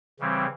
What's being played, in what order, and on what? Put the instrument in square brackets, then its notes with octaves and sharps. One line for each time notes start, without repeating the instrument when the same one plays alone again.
[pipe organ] C#3 E3 G3 C4